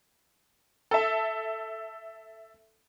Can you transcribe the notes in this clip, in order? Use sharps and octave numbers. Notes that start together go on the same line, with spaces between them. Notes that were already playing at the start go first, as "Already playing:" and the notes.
A4 E5